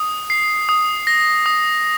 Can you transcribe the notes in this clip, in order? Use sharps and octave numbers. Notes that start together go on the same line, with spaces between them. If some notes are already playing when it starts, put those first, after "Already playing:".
Already playing: D#6
C7
D#6
A#6
D#6